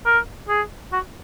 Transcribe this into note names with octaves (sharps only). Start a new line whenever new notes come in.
A#4
G#4
F#4